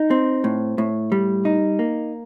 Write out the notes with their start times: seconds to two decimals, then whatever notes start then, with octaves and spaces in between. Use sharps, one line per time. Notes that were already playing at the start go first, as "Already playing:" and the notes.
Already playing: D#4
0.11 C4
0.44 A2
0.78 A2
1.12 G3
1.45 D#4
1.79 A#3